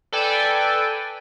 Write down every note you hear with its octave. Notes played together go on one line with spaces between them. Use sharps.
A4 B4 D5 G5 G#5